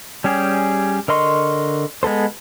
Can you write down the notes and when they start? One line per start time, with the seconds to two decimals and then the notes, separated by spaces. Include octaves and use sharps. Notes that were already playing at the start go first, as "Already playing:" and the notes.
0.24 G3 C#4 G4 G#4
1.08 D3 A#4 D#5 C6 C#6
2.03 G#3 B3 A4 C5